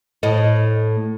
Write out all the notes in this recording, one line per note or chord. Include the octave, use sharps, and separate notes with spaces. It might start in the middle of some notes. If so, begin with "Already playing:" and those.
A2 D#5